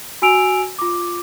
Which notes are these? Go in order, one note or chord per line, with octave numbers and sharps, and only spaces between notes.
F#4 G#5 E6 D7 F7
F4 D6